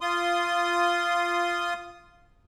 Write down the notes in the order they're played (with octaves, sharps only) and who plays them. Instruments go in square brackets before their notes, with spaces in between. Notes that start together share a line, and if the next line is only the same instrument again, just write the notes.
[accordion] F4 C6 D#6